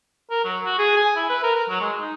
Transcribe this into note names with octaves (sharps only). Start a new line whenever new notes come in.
A#4
F#3
F#4
G#4
G#5
E4
B4
A#4
A#4
F#3
G#3
D#4